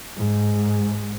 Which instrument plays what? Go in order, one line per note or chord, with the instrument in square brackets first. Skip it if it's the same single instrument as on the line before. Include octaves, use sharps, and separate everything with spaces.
[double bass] G#2